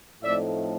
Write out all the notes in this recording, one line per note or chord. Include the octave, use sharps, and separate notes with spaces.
A2 F3 A3 C4 D#4 D5 E5